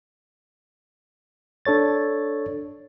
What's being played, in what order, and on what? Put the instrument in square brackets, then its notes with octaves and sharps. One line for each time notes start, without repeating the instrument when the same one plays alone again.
[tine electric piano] D4 A4 C#5 A6